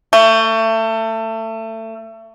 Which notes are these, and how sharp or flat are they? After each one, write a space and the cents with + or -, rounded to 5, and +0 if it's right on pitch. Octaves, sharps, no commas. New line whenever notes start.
A3 +25